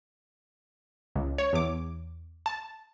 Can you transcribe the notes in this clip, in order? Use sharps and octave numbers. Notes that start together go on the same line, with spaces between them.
C#2
C#5
E2 D6
A5